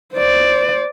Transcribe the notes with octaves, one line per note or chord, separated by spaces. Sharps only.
C5 D5